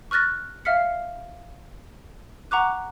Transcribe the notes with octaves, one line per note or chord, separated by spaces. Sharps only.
C#6 F6 F#6 A6 A#6
E5 F5 F6 B6 C#7
F#5 A#5 C#6 D6 F#6